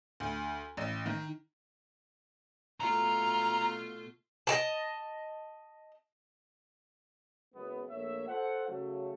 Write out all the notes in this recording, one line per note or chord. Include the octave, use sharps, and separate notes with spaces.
D2
A1
D#3
B2 A3 F4 A#5
D#5 G5 A5
F#1 F#2 G#3 B3
A#1 A3 A#3 C#5 E5
F4 A4 C5 F#5
C#3 F#3 A3